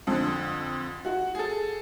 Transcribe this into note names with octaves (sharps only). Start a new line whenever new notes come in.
F2 D3
F#4
G#4 A4